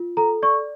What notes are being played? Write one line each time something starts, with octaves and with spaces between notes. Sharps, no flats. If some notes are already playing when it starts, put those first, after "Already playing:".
Already playing: F4
A4 A#5
D5 C#6